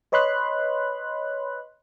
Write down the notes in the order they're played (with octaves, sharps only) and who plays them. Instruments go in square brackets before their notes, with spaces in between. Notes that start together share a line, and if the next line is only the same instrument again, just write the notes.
[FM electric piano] B4 C#5 D#5 B5 C6 F#6